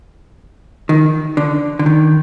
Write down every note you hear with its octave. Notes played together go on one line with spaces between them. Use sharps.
D#3
D3
D3
D#3